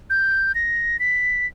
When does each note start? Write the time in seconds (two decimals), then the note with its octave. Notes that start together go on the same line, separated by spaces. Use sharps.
0.10 G6
0.55 A#6
1.00 B6